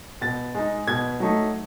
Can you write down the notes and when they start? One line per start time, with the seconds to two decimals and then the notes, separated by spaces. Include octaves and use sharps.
0.21 B2 A6
0.55 G#3 D#4
0.87 B2 G#6
1.20 F#3 A3 D#4